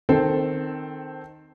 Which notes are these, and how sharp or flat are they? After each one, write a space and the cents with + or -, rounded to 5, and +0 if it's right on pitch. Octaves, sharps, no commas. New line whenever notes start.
D#3 -15 C4 +0 A4 +0